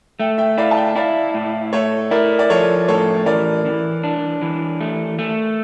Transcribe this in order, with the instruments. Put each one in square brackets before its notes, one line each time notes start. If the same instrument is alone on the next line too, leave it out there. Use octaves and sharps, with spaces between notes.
[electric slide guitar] A3 [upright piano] E5 G5
[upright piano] E5 G5
[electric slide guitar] E4 [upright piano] D5 F5
[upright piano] A5
E5 G5
[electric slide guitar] E4 [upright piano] D5 F5
[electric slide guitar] A2
[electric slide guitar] A3 [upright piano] C#5 E5
[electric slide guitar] E4 [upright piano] A#4 D5
[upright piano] D5
[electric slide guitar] F3 [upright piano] A4 C#5
[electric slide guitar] A2 [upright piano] A4 C#5
[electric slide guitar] E3 [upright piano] A#4 D5
[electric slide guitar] E3
D4
E3
A3
A3